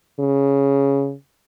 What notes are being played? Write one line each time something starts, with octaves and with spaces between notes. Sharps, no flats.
C#3